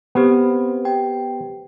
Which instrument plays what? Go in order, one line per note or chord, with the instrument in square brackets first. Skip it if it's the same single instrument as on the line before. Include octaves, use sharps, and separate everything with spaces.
[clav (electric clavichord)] B3 [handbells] C4 G4 C5
[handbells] G4 C5 G5